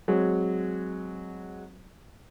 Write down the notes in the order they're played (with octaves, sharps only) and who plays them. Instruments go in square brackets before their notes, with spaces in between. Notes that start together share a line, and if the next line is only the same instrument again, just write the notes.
[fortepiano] F#3 G#3 C4